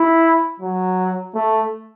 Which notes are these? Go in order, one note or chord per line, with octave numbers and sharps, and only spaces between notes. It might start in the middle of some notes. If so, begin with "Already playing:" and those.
Already playing: E4
F#3
A3